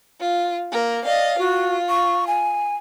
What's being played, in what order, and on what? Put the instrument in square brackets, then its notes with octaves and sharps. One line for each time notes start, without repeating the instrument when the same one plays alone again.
[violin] F4
A#3 A#4
[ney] D5 [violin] D#5 F5
[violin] F4 [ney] F#4
[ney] C#6
G#5